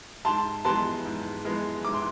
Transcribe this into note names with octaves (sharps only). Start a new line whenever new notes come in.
G#2 A5 C6
E3 G#3 B3 A5 C6
G#2
E3 G#3 B3
G#2 D6
C6